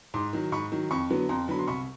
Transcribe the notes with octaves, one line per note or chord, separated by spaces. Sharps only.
G#2 C6 D6
D#3 F#3
G#2 B5 C#6
D#3 F#3
F2 B5 C#6
D3 F#3 B3
F2 A#5 C6
D3 F#3 B3 B5
C6
C2 B5 C#6